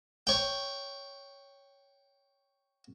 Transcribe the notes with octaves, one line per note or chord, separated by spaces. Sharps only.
C#5 G5